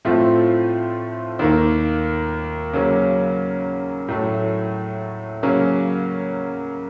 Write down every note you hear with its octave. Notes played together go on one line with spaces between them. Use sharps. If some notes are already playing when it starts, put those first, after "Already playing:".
A2 F3 A3 C4 F4
D#2 D#3 A#3
C#3 F#3 A#3 C#4
A2 F#3 A3
C#3 F#3 A#3 C#4